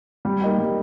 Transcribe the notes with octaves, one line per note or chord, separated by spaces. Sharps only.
G3
A#3 D#4 G4
G3